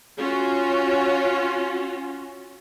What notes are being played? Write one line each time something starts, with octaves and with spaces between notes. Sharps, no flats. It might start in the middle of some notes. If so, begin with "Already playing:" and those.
C#4 F4 F#4